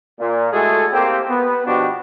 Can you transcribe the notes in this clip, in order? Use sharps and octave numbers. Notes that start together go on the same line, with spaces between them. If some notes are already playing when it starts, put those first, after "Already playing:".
A#2
G#3 A3 E4 F#4 G#4 A4
A#3 C4 G4
B3
B2 F3 B3 D4 F#4 G4